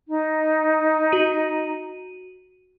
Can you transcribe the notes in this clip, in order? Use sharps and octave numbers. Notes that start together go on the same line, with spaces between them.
D#4
F#4 D#7